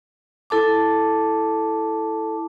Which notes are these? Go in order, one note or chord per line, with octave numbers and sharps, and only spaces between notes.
E4 A4 A5 D6